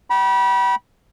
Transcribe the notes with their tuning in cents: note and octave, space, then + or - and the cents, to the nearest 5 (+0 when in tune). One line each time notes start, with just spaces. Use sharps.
G5 -40 B5 -30